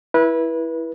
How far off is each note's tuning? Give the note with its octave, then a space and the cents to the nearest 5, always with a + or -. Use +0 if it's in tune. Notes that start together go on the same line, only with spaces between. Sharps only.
E4 +0 B4 -25